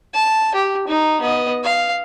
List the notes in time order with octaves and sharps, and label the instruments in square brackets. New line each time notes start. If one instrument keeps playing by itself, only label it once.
[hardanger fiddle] A5
G4
D#4
B3 D#5
F5